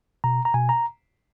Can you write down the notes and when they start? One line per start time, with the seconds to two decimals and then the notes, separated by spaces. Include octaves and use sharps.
0.24 B2 A#5
0.45 A#5
0.54 B2 G#5
0.69 A#5